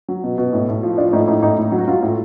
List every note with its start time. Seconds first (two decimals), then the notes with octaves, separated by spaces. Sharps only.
0.08 F#3
0.24 B2
0.38 B2
0.53 A2
0.69 A2
0.83 F3
0.98 F3 D4
1.13 A2 D#4
1.27 A2 D#4
1.42 A2 D#4
1.58 A2
1.72 F#3
1.79 F#4
1.87 F#3 F4
2.03 A2